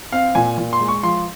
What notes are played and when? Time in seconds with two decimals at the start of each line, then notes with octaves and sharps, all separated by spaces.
0.12 C4 F5
0.35 A#2 G#5
0.58 A#2
0.73 C6
0.80 G#3
0.88 C#6
1.03 F3 C6